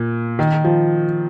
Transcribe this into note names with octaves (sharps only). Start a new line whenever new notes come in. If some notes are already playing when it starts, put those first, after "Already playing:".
Already playing: A#2
D#3
F3